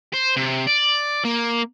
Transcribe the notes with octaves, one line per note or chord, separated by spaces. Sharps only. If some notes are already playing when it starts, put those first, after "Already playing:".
C5
C3
D5
A#3